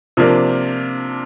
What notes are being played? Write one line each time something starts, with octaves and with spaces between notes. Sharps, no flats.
C3 F3 A#3 D4